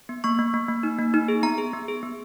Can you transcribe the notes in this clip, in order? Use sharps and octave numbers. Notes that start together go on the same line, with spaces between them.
B3
A#3 C#6
A#3
A#3
A#3
D#4
A#3
D#4
G#4
B3 A#5
G#4
B3
G#4
B3